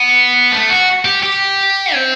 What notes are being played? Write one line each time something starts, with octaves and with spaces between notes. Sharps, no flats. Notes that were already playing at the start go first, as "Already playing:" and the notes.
Already playing: B3
A3
F#4
G4
G4
C4